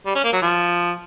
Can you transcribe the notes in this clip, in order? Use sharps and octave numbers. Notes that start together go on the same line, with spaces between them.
G3
C#4
A#3
F#3
F3